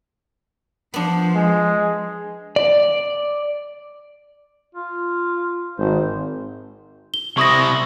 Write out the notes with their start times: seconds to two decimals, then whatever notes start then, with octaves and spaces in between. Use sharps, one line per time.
0.94 F3 B3 D4
1.35 G#3
2.56 D5
4.75 F4
5.78 G#1 C5
7.14 G7
7.38 C3 E4 C#6 D#6 A#6